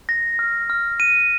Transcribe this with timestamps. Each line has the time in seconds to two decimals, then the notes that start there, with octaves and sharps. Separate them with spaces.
0.09 A#6
0.39 F6
0.70 F6
1.00 D#7